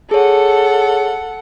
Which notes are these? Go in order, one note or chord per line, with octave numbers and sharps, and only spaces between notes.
G#4 A4 C#5 F#5